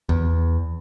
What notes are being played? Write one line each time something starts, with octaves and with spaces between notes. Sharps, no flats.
E2